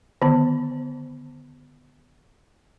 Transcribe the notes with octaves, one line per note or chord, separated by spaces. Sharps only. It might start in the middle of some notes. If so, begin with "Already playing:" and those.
D3 D#3 B3